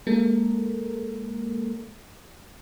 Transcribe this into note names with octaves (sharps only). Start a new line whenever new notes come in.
G#3 A#3 A4 A#4